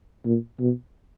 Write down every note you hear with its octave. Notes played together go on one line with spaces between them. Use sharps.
A#2
B2